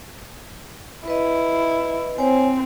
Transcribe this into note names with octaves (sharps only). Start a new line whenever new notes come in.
E4 B4 D#5
C4 C5 C#5 G#5